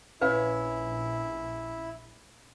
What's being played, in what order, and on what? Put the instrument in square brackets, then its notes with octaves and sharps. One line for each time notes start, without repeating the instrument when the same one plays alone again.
[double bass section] A#1 [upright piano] C#4 [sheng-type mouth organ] E4 [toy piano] B4 F5